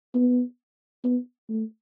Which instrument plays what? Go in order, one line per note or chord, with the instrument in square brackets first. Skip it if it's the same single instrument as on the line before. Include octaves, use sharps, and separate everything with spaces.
[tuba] B3
B3
A3